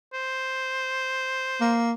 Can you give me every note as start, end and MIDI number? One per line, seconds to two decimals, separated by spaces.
0.13 1.80 72
1.61 1.93 58